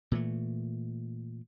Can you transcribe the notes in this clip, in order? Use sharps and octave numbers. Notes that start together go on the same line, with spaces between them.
A#2 E3 A3